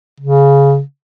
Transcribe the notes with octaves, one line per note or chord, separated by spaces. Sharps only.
C#3